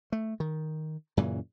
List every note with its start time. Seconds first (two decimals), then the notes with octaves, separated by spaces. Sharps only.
0.12 A3
0.40 D#3
1.17 F#2 A#2 C#3 E3